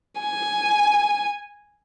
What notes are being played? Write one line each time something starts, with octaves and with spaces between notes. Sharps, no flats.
G#5